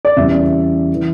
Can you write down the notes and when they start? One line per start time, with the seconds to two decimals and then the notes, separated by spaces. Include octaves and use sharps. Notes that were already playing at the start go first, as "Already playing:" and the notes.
0.05 D5
0.16 E2 C#3 E3 G3 E5
0.95 E3